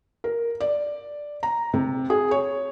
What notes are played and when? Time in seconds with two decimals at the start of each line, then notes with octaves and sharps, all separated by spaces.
0.24 A#4
0.61 D5
1.43 A#5
1.74 C3
2.10 G#4
2.31 C#5